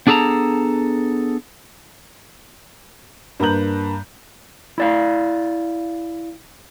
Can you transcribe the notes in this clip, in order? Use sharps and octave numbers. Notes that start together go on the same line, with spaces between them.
B3 D4 G#4 A4 A5 A#5
G2 A#3 B4 A#5 G6 F#7
E4 D5 F5